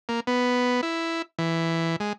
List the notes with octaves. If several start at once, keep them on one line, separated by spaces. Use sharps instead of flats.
A#3
B3
E4
E3
G#3